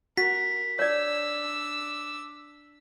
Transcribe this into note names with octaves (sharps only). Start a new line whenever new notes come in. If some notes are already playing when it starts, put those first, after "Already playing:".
F#4 A#4 B6
D4 C#5 D5 E6